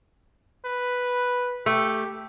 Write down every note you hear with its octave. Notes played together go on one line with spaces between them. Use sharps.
B4
A3 G4